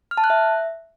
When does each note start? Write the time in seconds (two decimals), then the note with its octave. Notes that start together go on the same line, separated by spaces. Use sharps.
0.11 F6
0.17 A5
0.24 F#6
0.30 E5